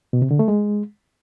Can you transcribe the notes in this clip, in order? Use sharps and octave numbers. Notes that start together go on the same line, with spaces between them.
B2
C3
D3
A3
G#3